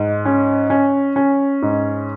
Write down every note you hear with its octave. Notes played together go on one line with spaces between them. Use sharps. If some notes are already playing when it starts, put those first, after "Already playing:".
Already playing: G#2
C#4
C#4
C#4
G#2